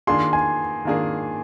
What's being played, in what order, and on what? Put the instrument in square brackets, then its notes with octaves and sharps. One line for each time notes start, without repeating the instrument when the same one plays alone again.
[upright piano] D#3 A#3 D4 F4 G#4 [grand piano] C6
[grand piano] G#5
[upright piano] D#3 A#3 D4 F4 G#4